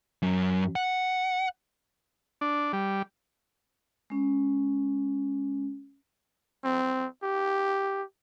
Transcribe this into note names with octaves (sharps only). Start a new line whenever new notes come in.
F#2
F#5
D4
G3
G#3 C#4
C4
G4